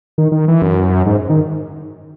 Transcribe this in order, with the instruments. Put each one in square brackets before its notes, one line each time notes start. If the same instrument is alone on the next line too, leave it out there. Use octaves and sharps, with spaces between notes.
[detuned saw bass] D#3
D#3
E3
F#2
G#2
D#3